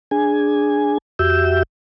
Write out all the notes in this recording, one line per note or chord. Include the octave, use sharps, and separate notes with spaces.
D4 G#4 G#5
F2 F#4 G4 E5 E6 G6